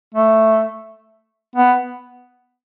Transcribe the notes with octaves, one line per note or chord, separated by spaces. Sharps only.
A3
B3